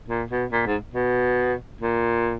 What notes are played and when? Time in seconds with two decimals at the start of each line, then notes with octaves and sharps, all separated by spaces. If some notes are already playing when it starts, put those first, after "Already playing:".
0.08 A#2
0.30 B2
0.52 A#2
0.66 G#2
0.94 B2
1.81 A#2